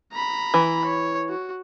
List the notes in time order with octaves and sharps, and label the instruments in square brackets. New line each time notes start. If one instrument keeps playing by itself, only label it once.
[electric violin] A#5 B5
[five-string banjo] E3
[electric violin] C#5
F#4